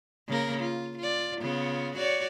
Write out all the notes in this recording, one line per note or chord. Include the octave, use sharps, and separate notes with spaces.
C#3 A#3 A#4
F4
F4 D5
C#3 B3 F4
F#4 C#5 D5